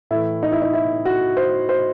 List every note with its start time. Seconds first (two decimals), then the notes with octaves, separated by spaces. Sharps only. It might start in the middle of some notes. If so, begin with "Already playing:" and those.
0.11 A2 E4
0.15 E3
0.43 D#4
0.52 E4
0.62 D#4
0.73 E4
1.05 F#4
1.37 C5
1.69 C5